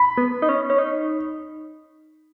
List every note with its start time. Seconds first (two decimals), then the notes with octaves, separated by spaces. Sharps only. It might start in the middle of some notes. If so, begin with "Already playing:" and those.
Already playing: B5
0.18 B3
0.42 D#4
0.49 C#4
0.70 C#4
0.78 D#4